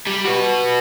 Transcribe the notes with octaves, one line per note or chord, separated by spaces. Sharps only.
G3
F#4 B4